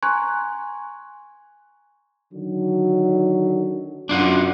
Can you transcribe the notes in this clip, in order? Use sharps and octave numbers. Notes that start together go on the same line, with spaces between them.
G#5 A#5 C6 C#6 F#6 G#6
D3 D#3 F#3
F#2 D4 F4 F#5